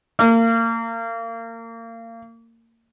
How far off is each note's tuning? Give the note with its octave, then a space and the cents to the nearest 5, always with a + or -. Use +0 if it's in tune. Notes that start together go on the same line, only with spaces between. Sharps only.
A#3 -30